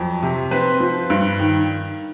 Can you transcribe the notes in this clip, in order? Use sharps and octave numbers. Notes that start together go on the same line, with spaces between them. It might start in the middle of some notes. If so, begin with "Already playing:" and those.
Already playing: F2 F#3
C3
C4 B4
F3
G2
D#3